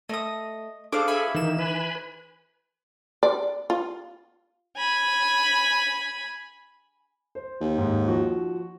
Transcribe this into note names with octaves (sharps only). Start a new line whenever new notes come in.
A3 D#5 D#6
D4 G#4 A4 C5 F5 D6
E5 G#5 B5
D#3 E3 D#4 E7
B4 G#5 B5
D5
F4
G#5 B5
C5
D#2
G#2
F3 F#4